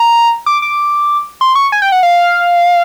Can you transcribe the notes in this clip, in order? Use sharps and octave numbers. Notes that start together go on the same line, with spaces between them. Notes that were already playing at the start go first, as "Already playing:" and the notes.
Already playing: A#5
D6
D6
C6
C#6
G#5
G5
F#5
F5